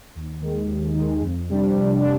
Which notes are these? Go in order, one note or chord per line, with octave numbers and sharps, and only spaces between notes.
D#2
D#3 G#3
D#2
D#3 G#3
F2
C3 G3 D4
F2
D4